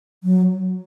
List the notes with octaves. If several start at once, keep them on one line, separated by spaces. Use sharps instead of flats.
F#3